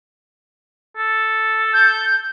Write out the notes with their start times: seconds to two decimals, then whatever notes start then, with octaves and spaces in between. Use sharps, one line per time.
0.97 A4
1.73 G6